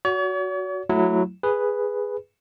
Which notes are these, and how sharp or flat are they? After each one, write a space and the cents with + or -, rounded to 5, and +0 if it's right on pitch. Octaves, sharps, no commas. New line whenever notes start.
F#4 +0 C#5 +45
F#3 -10 A3 +0 E4 +0
G#4 -5 B4 +0